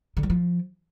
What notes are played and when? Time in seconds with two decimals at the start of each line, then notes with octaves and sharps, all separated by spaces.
0.17 D3
0.23 F#3
0.30 F3